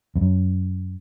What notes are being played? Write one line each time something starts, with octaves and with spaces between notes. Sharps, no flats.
F2
F#2